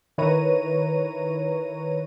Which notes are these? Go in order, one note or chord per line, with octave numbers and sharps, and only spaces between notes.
D#3 E4 B4 C#5 A#5 D#7